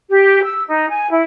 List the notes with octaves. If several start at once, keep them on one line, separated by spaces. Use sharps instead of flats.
G4
E6
D#4
G#5
E4